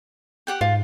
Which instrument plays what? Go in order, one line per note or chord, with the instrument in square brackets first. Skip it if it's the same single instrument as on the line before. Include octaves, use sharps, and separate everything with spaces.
[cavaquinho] G4 F#5 G5
[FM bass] G#2 [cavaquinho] F4